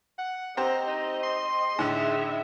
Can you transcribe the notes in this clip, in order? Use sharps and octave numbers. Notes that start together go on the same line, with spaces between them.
F#5
C4 G4 C5 D#5 A#5
D#4
C6
A2 D3 D#4 G#4 E5